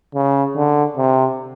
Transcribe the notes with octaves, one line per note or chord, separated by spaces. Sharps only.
C#3
D3
C3